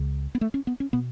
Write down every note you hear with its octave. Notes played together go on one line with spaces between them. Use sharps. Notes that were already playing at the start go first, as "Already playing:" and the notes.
Already playing: C#2 C#3
B3
A3
C#4
B3
C#4
B2 B3